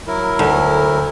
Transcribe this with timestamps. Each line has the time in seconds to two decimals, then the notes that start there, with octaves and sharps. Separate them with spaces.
0.07 F#3 E4 A#4
0.39 D2